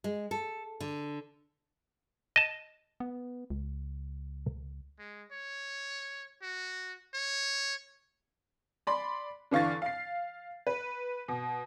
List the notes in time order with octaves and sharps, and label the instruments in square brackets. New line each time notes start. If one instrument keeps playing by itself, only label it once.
[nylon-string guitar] G#3
A4
D3
[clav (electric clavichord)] D#5 A5
[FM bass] B3
C#2
[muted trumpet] G#3
C#5
F#4
C#5
[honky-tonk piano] D5 B5 C6
D3 E3 F5 C#6 A6
F5 C7
B4
B2